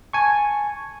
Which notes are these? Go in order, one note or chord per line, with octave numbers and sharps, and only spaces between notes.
G#5 A5 C#6